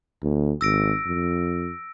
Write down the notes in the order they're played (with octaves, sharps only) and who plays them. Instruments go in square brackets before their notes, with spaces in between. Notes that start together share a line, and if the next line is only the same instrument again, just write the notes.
[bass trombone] D2
[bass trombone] G#1 [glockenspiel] E6 A#6 D7
[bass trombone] F2